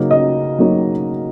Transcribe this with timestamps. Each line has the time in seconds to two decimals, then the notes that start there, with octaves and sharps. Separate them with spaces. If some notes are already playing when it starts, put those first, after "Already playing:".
Already playing: C#3 F#3 A#3 D#4
0.11 D#5
0.58 C#3 F#3 A#3 D#4